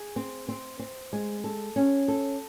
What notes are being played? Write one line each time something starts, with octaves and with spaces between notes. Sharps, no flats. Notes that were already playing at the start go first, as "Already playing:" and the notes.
Already playing: G#4
C4
C4
C4
G#3
A4
C#4
A4